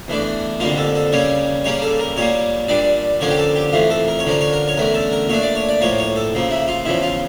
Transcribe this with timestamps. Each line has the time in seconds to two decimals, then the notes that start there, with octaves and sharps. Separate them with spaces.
0.08 E2 E3 A3 D4
0.60 F2 D3 G3 A#3 F4
0.78 A4
0.95 A4
1.12 C#3 G3 A#3 C#4 C#5
1.64 C#3 G3 A#3 C#4 C#5
1.82 A4
2.00 A#4
2.17 A#2 G3 A#3 C#5
2.68 A#2 G3 D4 D5
3.20 D3 F3 A#3 C#4 C#5
3.30 G4
3.38 A4
3.56 G4
3.73 F2 E3 A3 F4
3.90 A4
4.08 A#4
4.19 C#5
4.25 D3 F3 C#4 A#4
4.41 C#5
4.53 A#4
4.68 C#5
4.77 E2 D3 A3 C#4 A#4
4.94 A4
5.12 A#4
5.29 A#2 A3 D4 C#5
5.42 D5
5.55 C#5
5.69 D5
5.81 A2 F3 A#3 C#5
5.98 C#5
6.16 A4
6.34 C#3 F3 A#3
6.51 E4
6.68 F4
6.85 E2 C#3 F3 E4
7.03 F4